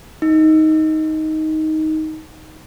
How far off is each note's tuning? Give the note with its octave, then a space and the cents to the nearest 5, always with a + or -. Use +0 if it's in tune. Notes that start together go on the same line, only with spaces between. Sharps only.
D#4 +10